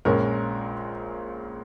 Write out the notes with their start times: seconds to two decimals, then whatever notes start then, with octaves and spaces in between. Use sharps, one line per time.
0.05 A#1 A#2 G#3 C#4 A#4